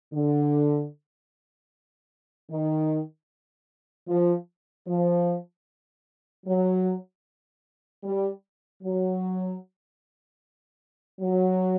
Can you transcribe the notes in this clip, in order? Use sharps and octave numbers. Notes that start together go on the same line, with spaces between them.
D3
D#3
F3
F3
F#3
G3
F#3
F#3